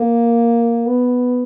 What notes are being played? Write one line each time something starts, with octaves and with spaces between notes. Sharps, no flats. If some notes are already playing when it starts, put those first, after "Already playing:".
Already playing: A#3
B3